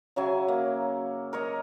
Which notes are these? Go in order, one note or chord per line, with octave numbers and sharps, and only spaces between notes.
C#3 F#3 E5 G#5
A#3
A#4 C#5 D#5